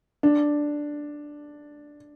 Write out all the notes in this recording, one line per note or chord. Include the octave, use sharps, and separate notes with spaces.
D4